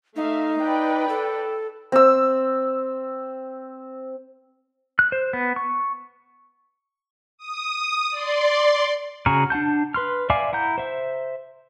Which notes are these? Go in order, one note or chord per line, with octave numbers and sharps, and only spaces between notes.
A3 D#4 E5 F5
B4 D5 G5
A4
C4 E6
F#6
C5
B3
C#6
D#6
D5 C6
C#3 F#4 G#4 A#5 F6
D4 F#5 A5 G6
B4 C6 F6
D5 E5 F5 G#5 D6
E4 F#5 A#5 G6
C5 E5